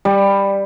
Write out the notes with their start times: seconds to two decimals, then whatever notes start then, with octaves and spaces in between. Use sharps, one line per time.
0.05 G3